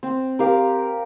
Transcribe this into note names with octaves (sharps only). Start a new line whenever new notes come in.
C4
G4 A#4 F5